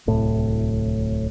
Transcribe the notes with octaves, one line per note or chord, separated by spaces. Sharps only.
D1 C2 A2